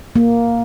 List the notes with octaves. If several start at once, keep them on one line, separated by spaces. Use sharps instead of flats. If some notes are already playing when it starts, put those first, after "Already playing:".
A#3